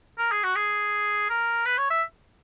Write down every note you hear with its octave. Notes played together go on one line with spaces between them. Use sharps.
A#4
G#4
F#4
G#4
A#4
B4
C#5
E5